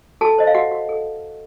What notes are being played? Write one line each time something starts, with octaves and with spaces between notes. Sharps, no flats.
F#4 A4 A5
C5 D#5
F5
F#4 F#5
F#4
A4